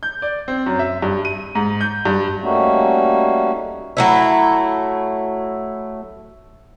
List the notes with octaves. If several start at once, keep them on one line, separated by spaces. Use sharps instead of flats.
G6
D5
C4
F#2
E5
G2
D#7
G#2
G6
G2
G3 A3 A#3 C#4 D#4 F#4
F#3 A3 E4